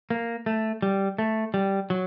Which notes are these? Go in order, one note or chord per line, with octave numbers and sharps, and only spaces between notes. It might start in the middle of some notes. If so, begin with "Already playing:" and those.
A#3
A3
G3
A3
G3
F#3